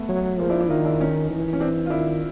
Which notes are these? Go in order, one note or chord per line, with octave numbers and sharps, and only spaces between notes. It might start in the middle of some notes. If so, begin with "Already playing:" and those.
Already playing: A3 B3
F#3
F3 G#3 A#3
D4 E4
D4 E4
D#3 D#4 F4
D4 E4
C#4 D#4
E3
C#4
C4 D4
F4
D#3 D4 E4